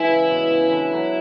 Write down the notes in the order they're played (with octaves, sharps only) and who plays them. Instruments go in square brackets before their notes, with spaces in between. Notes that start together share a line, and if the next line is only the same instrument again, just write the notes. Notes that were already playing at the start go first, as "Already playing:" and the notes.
Already playing: [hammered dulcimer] E3 G#3 [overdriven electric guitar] E4
[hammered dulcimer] C#3
B2
C#3
E3
D3
D3 F#3